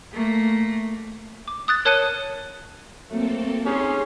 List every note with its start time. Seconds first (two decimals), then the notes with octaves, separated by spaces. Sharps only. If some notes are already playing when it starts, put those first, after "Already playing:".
0.13 A3 A#3
1.48 D6
1.68 D#6 F#6 A6
1.85 A#4 C#5 A5 F#6 C#7 D#7
3.10 F#3 A3 A#3 C4 A4
3.65 C#4 D#4 G4 G#4 C6